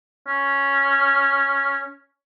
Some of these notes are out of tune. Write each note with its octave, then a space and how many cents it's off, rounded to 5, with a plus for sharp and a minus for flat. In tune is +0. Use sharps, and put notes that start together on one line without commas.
C#4 +0